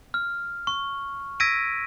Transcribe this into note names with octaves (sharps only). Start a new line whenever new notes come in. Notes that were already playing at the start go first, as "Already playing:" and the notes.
F6
C#6
E6 G#6 A#6 B6 D7 D#7